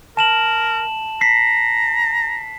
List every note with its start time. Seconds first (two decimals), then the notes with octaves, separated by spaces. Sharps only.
0.17 A#4 A5 E7 F#7
1.21 A#5 B6 C7